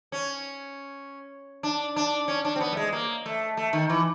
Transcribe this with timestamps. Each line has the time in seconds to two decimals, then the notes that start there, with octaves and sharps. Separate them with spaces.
0.12 C#4
1.63 D4
1.96 D4
2.28 C#4
2.45 D4
2.56 C4
2.60 B3
2.72 A3
2.77 G#3
2.93 A#3
3.26 A3
3.57 A3
3.73 D#3
3.90 E3